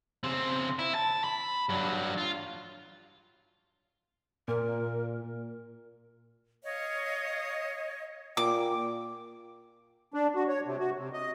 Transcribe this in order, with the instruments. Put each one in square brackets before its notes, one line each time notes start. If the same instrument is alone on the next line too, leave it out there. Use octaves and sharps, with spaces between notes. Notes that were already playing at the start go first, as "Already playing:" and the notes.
[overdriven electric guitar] C#3 C4
E4
A5
B5
G2 F#3
F4
[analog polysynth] A#2 [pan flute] A#4
[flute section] C#5 D#5 F5
[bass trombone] A#2 [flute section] G5 [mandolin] D6
[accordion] D4
F#4
C#5
C3
F#4
C3
D#5